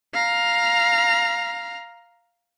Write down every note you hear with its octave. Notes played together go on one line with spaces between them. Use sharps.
F5 A#5